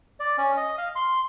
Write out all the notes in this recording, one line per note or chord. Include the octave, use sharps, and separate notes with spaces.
D5
C#4
D#5
F5
C6